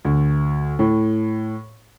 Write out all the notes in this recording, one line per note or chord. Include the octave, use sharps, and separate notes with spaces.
D2
A2